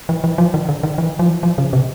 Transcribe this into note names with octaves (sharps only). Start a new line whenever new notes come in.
E3
E3
F3
D#3
D3
D#3
E3
F3
E3
F3
C#3
C3